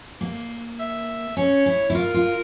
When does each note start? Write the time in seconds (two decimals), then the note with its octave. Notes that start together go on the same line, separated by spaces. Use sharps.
0.21 A#3
0.79 E5
1.36 C#4 C#5
1.66 E4
1.90 E4
1.95 F4 A#4
2.14 F4